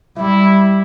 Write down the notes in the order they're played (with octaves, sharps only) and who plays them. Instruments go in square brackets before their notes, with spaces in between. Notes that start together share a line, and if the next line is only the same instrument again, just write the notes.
[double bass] G3 [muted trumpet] E4